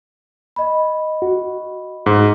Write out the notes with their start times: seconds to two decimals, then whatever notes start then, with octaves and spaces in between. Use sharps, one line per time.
0.56 D#5 B5
1.22 F#4
2.06 G#2